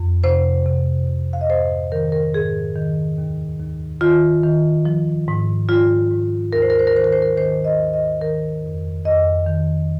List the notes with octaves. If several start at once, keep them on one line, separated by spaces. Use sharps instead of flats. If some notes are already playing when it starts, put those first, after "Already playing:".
Already playing: F2
C3 C5
C3
C3
F5
D#5
G#2 C5
D#3 A#4
A#4
G#2 G#4
D#3
D#2
D#2
D#3 F4
D#3
F3
G#2
G#2 F4
G#2
D#2 A#4
C5
A#4
C5
A#4
D#3 C5
A#4
C5
A#4
D#3 C5
D#5
D#2
D#5
D#3 A#4
F2
F2 D#5
D#3